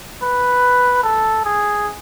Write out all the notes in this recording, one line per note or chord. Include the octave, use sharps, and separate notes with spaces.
B4
A4
G#4